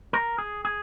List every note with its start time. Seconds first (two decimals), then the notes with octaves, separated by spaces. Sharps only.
0.13 A#4
0.38 G#4
0.65 G#4